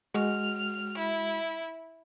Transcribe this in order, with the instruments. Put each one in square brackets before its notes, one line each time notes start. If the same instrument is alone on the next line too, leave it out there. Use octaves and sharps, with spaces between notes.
[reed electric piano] G#3 F#4 [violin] F6
[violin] E4